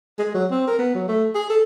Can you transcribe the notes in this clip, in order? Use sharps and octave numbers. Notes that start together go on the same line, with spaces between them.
G#3
F#3
C4
A#4
B3
F#3
A3
G#4
A4